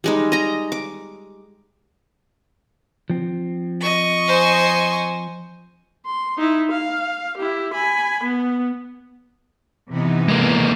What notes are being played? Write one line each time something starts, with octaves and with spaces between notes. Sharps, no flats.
G3 G#3 D#4
D#5 A#5
D6
F3 C4
D#5 C#6
C5 G#5
C6
D#4 E4
F5
E4 G4
G#5 B5
B3
C3 E3 B3 D#4
G#3 A#3